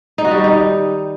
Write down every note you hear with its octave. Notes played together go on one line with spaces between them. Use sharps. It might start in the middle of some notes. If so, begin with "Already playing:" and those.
D#4
F#4
G3
D#3
D#4